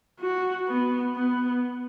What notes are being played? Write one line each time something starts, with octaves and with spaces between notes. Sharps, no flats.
F#4
B3
B3